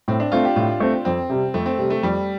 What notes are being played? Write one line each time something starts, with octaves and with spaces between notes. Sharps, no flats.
A2 C4
D4
A3 C4 F4
G4
A2 F4
A3 C4
F2 C4
C3 G3
F2 A3
C4
C3 G3
A3
F2 G3